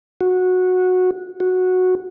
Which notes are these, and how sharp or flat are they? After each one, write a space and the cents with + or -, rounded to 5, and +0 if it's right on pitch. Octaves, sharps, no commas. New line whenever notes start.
F#4 -15
F#4 -10